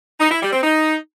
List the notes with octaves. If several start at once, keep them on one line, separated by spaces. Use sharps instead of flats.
D#4
E4
G3
C4
D#4